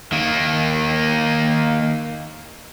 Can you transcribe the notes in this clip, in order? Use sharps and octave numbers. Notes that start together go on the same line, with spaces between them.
D#3 A#3